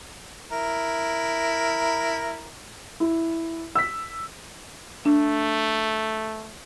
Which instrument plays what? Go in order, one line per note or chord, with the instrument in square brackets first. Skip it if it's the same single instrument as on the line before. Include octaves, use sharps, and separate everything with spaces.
[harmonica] E4 A#4
[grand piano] E4
E6 B6
[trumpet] A3 [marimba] D4